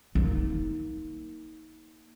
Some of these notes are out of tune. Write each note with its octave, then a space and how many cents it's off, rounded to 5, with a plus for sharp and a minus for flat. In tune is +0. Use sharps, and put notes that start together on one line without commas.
A#3 +0 D#4 +25